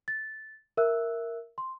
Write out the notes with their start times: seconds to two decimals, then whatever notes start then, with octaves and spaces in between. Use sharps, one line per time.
0.08 A6
0.77 A#4 E5 E6 F#6
1.58 C6